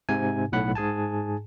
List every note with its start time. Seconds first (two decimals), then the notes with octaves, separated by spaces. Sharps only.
0.09 G#2 C3 G#5
0.52 B1 A2 F#5 B5
0.75 G#2 G#4 G#5 A5